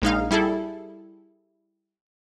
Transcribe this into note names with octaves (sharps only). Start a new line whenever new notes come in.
A#1 G#3 D#4 F5
G3 E4 G#4 A4